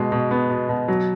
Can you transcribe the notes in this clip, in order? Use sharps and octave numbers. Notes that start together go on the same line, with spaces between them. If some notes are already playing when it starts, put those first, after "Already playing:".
Already playing: B2 G#3
B2
B3
B2
B2
F#3